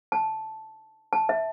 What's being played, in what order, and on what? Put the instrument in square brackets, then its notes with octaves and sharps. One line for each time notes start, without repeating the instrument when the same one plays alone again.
[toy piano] A5
A5
E5